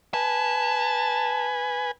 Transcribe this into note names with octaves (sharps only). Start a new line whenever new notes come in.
B4 G#5 A5